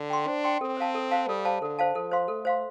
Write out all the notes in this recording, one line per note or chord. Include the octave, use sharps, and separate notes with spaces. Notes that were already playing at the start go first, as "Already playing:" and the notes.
Already playing: D3
G5 C6
D4 C5
G5 C6
C4 A4
C5 F5 A5
A4
C5 F5 A5
G3 A4
C5 F5 A5
D3 A4
C5 F5 A5
F3 A4
C5 F5 C6
A3 A4
C5 F5 C6